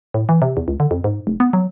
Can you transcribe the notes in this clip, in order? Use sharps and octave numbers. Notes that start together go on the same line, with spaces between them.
A2
E3
C3
E2
C#2
D3
F2
G#2
F1
B3
F#3